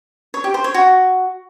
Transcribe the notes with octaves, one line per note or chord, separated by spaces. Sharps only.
C#5
G4
C5
C#5
F#4